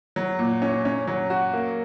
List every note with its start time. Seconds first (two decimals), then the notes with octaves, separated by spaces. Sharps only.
0.16 F#3
0.39 A#2
0.62 C#4
0.85 C#4
1.07 F#3
1.30 F#4
1.53 A#3